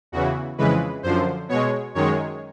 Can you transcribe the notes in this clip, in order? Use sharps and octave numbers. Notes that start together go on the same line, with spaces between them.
E2 C#3 E3 F#4
F2 C#3 E3 G#3 B4
F#2 D3 F3 C5
B2 G#3 C#5
F#2 D#3 G#3 C#5